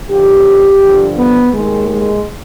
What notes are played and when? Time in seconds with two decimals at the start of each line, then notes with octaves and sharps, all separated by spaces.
0.10 D#2 D3 F3 G4
0.82 G2 D3 F3
1.18 B3
1.54 D#2 D#3 G#3
1.90 G#3